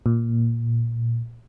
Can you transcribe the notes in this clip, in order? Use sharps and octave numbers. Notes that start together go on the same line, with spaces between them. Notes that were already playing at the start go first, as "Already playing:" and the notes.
A#2